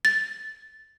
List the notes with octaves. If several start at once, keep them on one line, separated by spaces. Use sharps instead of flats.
A6